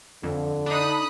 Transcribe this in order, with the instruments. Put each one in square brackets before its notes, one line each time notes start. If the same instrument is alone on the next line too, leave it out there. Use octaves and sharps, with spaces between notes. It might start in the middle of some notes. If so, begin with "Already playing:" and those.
[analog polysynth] F2 [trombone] D3
[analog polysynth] D4 D#4 [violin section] B5 D#6 F#6